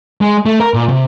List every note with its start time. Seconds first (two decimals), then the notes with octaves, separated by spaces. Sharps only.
0.21 G#3
0.46 A3
0.60 A#4
0.74 A#2
0.89 C3